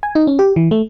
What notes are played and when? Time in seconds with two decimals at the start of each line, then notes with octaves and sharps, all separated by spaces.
0.03 G#5
0.15 D#4
0.27 C#4
0.39 G4
0.56 E3
0.71 A3